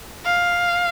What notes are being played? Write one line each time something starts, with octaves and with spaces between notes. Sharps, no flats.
F5